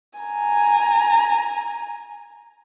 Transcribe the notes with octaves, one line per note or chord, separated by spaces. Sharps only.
G#5 A#5